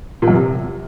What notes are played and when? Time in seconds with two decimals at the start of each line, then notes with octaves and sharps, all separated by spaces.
0.22 A#2
0.28 F#2
0.33 C3